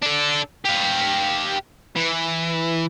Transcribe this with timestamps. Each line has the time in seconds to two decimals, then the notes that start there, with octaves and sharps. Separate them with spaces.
0.02 D4 A4
0.65 G4 F5
1.96 E3